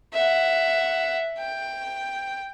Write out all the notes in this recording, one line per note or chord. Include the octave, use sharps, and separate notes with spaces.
E5 F#5
G5